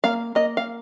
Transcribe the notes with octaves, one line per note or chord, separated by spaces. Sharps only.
A#3 F5
A#3 D#5
F5